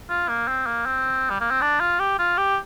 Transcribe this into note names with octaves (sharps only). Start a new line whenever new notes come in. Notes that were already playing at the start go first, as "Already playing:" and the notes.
F4
A#3
C4
A#3
C4
G3
A#3
C4
D4
F4
G4
F4
G4